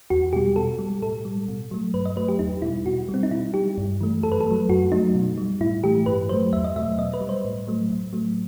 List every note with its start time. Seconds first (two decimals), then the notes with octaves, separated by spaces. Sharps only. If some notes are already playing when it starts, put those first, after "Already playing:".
0.10 E2 F#4
0.33 B2 G3 G4
0.56 B2 A4
0.79 G3
1.02 A2 A4
1.25 G3
1.48 B2
1.71 F#3 A3
1.94 G2 B4
2.06 D#5
2.16 F#3 A3 B4
2.28 G4
2.39 E2 D#4
2.62 B2 G3 E4
2.86 B2 F#4
3.09 G3
3.14 C4
3.23 D#4
3.31 B2 E4
3.54 G3 G4
3.78 G2
4.01 E3 A3
4.23 F#2 A4
4.32 B4
4.41 A4
4.46 F#3 A3
4.69 F#2 F#4
4.92 F#3 A3 D#4
5.15 B2
5.38 G3
5.61 A2 E4
5.83 E3 A3 G4
6.06 G2 B4
6.29 F#3 A3 C5
6.53 E2 E5
6.64 D#5
6.75 B2 F#3 A3 E5
6.98 B2 D#5
7.14 B4
7.21 G3
7.29 C5
7.45 A2
7.67 F#3 A3
7.91 A2
8.13 F#3 A3